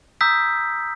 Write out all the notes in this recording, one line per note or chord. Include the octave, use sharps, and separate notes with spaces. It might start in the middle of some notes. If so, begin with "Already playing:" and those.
A#5 D#6 E6 G6 B6